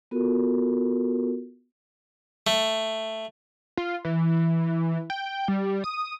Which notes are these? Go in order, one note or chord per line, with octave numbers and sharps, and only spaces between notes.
B3 F4 F#4 A4 A#4
A3
F4
E3
G5
G3
D#6